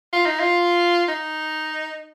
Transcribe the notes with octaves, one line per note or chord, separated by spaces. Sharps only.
F4
D#4
F4
D#4